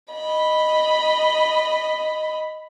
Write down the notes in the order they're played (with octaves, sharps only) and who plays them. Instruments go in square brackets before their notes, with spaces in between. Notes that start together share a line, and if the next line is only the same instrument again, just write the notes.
[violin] D#5 B5